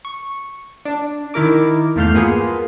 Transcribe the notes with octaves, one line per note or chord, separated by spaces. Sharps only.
C#6
D4
D#3 E4 A#4 D6
E2 G2 A3 F5 F6 G6
A#3 B3 F4 G#4